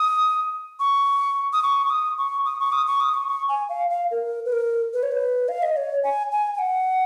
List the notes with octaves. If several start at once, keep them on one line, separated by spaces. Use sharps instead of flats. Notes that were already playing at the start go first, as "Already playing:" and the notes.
Already playing: D#6
C#6
D#6
C#6
C#6
D#6
C#6
D#6
C#6
D#6
C#6
D#6
C#6
C#6
G#5
F5
F5
A#4
B4
A#4
B4
C#5
B4
F5
D#5
C#5
G#5
G#5
G#5
F#5